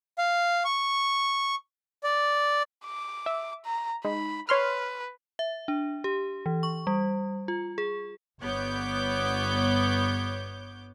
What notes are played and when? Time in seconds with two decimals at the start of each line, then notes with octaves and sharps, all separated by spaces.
0.18 F5
0.65 C#6
2.04 D5
2.86 D6
3.26 E5
3.65 A#5
4.05 G#3 D#4 B5
4.49 B4 C#5 C6 F6
5.39 E5
5.68 D4
6.04 G4
6.46 E3
6.63 C#6
6.87 G3
7.48 F4
7.78 G#4
8.41 G1 B3 C#5 D6 G6